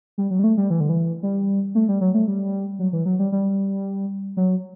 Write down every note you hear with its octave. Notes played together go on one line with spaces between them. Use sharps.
G3
F#3
G3
A3
G3
E3
D3
E3
G3
A3
G3
F#3
A3
G3
F#3
E3
F#3
G3
G3
F#3